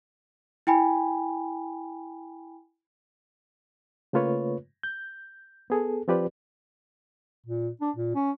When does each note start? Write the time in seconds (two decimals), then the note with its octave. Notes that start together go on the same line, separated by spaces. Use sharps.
0.67 E4 G5 G#5 B5
4.13 C#3 A3 A#3 F4 B4 C#5
4.83 G6
5.70 B3 G#4 A4
6.08 F3 C4 F4 G4 B4 D5
7.46 A#2
7.81 D4
7.96 A#2
8.15 C#4